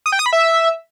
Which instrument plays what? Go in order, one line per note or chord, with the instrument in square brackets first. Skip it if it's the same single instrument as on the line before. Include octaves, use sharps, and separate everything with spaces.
[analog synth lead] D#6
G5
D#6
B5
E5